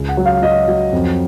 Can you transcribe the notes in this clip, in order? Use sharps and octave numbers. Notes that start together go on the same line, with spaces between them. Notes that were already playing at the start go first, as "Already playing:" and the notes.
Already playing: C#2
F#5
F#3
F5
F#3 D#5
F#3
F2